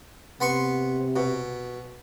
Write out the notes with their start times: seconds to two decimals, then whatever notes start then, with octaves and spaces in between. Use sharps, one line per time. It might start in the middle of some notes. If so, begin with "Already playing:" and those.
0.41 C3 B3 C6 C#6
1.16 B2